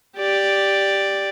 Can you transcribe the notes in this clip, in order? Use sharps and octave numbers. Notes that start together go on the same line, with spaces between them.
G4 D5